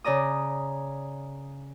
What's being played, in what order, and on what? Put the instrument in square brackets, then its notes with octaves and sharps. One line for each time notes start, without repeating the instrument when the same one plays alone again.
[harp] C#3 D5 A#5 D#6